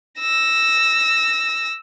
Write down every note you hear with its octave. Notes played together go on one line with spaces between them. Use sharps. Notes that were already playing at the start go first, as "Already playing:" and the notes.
E6 A#6